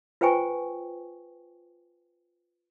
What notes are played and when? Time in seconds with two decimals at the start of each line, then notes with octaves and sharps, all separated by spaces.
0.21 F4 B4 C5 G5 G#5 C#6